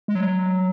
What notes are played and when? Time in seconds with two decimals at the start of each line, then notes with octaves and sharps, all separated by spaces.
0.08 G#3
0.15 F#3